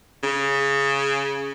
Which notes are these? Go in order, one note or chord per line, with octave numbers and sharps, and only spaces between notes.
C#3